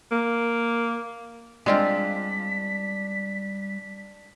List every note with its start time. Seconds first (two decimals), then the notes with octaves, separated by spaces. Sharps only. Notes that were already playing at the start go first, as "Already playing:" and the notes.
0.11 A#3
1.66 G3 G#3 C4 D4 F4 B6